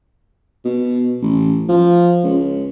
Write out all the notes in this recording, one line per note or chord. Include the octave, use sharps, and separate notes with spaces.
B2
A1
F3
C#2